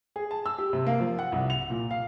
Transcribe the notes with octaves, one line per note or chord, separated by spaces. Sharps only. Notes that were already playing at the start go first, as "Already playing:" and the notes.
G#4
A5
E6
G4
C3
A#3
F3
F#5
C2
F7
A#2
F5